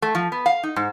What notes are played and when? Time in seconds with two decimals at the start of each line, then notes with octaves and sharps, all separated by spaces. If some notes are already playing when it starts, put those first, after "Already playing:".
0.02 A3
0.15 F3
0.32 B3
0.46 F5
0.63 D#4
0.76 G#2